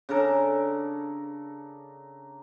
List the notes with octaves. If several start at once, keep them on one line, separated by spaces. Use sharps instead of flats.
C#3 D4 A4 A#4